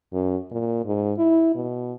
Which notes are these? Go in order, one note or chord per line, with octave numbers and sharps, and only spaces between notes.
F#2
A#2
G#2
E4
B2